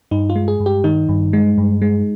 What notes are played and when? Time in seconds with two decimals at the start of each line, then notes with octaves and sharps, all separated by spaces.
0.11 G2 D#4
0.30 F4
0.36 G#3
0.48 G#4
0.60 G2
0.66 G4
0.84 D#3 D#4
1.09 G2
1.33 G#3
1.58 G2
1.82 G#3